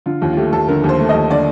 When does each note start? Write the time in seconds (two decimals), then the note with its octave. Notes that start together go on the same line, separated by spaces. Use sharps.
0.06 D3 F4
0.22 D#2 F4
0.33 F4
0.37 A3 G4
0.53 D#2 A4
0.68 D3 A#4
0.84 D#2
0.89 C5
0.99 A3
1.09 D#5
1.14 D#2
1.30 D3 D5